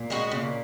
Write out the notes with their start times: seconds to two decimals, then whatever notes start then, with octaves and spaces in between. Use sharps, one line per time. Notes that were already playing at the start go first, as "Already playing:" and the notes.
Already playing: A#2
0.10 G#3 B3 F#4
0.31 A#2 C#3